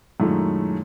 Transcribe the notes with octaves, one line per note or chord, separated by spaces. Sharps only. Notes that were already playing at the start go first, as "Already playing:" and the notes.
F#2 A#2 D#3 G#3 A3 E4